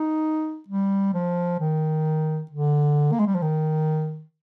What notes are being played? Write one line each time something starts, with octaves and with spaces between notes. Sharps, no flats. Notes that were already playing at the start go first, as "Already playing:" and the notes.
Already playing: D#4
G3
F3
D#3
D3
A#3
G#3
G3
F3
D#3